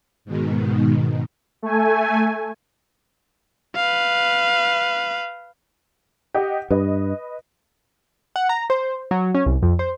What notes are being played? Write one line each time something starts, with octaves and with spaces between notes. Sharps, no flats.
G#2 B2 D#3
A3 G#5
B4 F5
G4 D#5 F#5
G2 B4 D#5
F#5
A#5
C5
F#3
C#4
C2
F2
C5